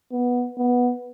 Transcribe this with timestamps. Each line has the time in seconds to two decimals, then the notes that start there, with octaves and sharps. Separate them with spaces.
0.12 B3
0.58 B3